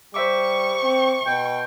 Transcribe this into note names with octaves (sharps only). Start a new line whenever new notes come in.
G3 C5 E5 C#6 D6
C4
B2 G5